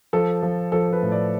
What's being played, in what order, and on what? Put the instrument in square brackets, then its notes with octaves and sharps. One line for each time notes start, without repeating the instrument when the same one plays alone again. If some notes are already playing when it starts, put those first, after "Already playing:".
[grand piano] F3 A4
F3
F3 A4
B4
A2
D5